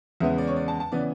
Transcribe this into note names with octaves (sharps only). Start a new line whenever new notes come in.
E2 C#3 G#3 B3 E5
D5
C#5
D5
A5
A5
C#3 E3 B3 D5